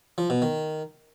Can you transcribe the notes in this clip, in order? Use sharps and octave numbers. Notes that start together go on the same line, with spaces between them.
F3
B2
D#3